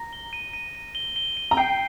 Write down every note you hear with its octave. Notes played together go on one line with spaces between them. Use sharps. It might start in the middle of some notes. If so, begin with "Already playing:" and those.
Already playing: A#5 A#6
G7
D#7
D#7
D#7
G7
G7
D#7
A#5
G5 C7